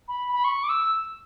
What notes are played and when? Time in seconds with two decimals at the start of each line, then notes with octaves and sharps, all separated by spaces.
0.08 B5
0.33 B5
0.44 C#6
0.64 D6
0.69 E6